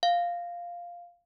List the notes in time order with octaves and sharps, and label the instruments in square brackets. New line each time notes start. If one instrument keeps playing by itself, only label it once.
[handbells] F5